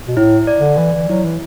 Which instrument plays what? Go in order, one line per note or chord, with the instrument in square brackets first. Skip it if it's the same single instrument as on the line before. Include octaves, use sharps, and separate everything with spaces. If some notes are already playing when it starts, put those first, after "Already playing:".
[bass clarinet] B2
[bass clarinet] A2 [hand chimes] E4
[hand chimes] D5
[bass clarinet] D3
[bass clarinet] E3 [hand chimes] D5
[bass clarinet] E3
[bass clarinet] F#3 [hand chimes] E4
[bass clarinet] E3